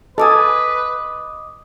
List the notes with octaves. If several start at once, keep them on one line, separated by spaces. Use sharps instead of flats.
A4 B4 D#5 G#5 D6 D#6